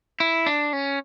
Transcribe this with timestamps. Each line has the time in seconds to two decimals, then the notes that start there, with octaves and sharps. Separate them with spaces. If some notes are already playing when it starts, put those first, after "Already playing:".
0.20 E4
0.46 D4
0.73 C#4